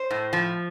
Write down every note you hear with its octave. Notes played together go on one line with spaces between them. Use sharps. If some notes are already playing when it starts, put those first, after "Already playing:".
Already playing: C5
A2
F3